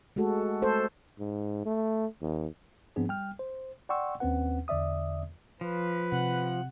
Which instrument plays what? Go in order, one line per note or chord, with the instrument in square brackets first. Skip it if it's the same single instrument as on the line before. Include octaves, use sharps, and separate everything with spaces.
[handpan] G#3 A3 F#4 A4
A3 A4 C5
[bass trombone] G#2
A3
D#2
[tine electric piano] G#2 F3 B3 C4 D4 G#4
G3 G5 F6
C5
D5 F#5 G5 C6 C#6 E6
D#2 C4 C#4 B4 F#5
E2 D3 D5 E5 D#6
[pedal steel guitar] F3 [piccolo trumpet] B4
[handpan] C3 [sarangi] F#5